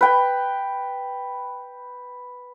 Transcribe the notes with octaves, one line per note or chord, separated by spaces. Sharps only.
B4 G5